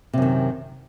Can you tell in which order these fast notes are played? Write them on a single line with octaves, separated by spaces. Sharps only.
C3 F#2 D#3